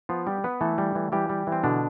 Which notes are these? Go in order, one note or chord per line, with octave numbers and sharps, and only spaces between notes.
F3 B3 F4
G3 G4
B3 B4
E3 A3 A4
G3
E3
E3 G3 G4
G3
E3
C4
B2 D3 D4